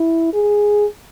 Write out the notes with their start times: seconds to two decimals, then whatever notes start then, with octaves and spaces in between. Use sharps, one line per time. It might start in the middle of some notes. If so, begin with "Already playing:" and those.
Already playing: E4
0.34 G#4